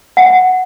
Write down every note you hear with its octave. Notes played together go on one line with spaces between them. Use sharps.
F#5